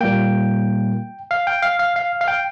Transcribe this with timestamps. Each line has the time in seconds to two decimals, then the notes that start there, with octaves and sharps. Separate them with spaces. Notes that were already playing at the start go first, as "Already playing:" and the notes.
0.01 A#2 G3 A#3 G5
1.31 F5
1.47 G5
1.62 F5
1.79 F5
1.96 F5
2.21 F5
2.28 G5